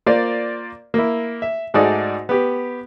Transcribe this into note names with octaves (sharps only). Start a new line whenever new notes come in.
A#3 F4 C5 D5
A#3 E4
E5
G#2 A3 D#4 F#4 G#4 D5
B3 G4